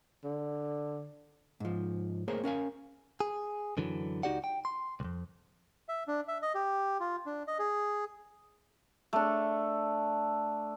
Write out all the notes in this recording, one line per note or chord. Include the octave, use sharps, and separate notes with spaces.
D3
G#2 F3
A3 A#3 G#4 A#4 C5 C#5
C#4 A#4 F5 G#5
G#4
F#2 D3 E3 F#3
C#2 D#4 F#4 G4 D5 F#5
G5
C6
C2 F2
E5
D4
E5
D#5
G4
F4
D4
D#5
G#4
A3 D4